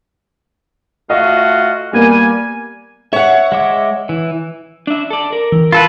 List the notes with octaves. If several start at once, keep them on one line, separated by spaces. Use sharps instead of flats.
A3 F4 F#4 D#5
G3 A#3 B3 G#5
C#5 E5 F#5
G#3 E5 D6
E3
D4 E5
A4 D5
A#4
E3
F4 A4 B4 B5